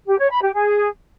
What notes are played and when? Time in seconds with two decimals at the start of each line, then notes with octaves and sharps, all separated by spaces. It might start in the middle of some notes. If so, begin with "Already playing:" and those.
0.07 G4
0.18 C#5
0.30 B5
0.41 G4
0.53 G#4